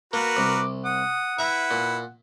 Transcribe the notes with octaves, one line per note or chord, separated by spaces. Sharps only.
A#3 F#4 A#4 B4
C2 D6
F#5 D#6
E4 B4 E5 A#5
A#2